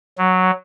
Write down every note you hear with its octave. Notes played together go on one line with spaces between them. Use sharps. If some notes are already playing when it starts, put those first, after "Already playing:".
F#3